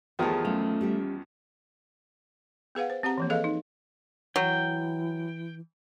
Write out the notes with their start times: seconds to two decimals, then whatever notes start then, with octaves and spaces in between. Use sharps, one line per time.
0.19 E2 D#3 F3 A3 F4 G4 G#4 C#5
0.45 F#3 A3 C#4 F4
0.81 G3 G4 E5
2.75 B3 G#4 B4 F5 F#5
2.90 C5
3.03 C4 G4 F#5 A#5
3.18 E3 F3 A#3
3.30 G#4 A4 B4 D#5 F5
3.44 D#4
4.36 E3 F#3 G5